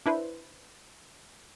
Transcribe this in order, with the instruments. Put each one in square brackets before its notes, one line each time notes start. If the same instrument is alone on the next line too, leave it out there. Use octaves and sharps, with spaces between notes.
[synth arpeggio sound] D4 E4 B4 C5